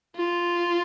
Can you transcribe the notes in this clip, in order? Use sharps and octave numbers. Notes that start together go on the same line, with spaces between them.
F4